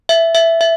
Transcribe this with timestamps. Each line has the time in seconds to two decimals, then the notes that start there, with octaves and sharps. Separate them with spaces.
0.09 E5
0.35 E5
0.61 E5